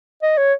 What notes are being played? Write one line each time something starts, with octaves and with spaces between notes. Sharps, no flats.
D#5
C#5